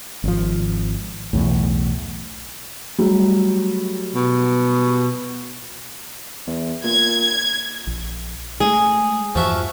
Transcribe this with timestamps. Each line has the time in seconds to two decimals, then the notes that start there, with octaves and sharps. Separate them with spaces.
0.24 G#1 F3
1.33 B1 E2 A2
2.98 F#3 G3 A3
4.15 B2
6.47 E2
6.84 A#2 G#6
7.87 A#1
8.60 G#3 A3 G#4
9.35 E2 G2 F3 F#4 E5